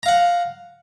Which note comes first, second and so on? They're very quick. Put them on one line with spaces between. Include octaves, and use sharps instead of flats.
A#5 F5 F#5